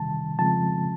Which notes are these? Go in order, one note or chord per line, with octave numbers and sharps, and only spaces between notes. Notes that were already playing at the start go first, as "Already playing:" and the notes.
Already playing: C3 D#3 G3 A5
C#3 F3 G#3 C4 A5